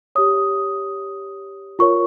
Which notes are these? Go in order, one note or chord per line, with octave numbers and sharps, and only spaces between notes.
G4 C#5 D#6
F4 A#4 C#5 C#6